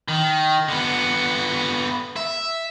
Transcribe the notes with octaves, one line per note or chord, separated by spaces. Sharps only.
D#3
D3 B3
E5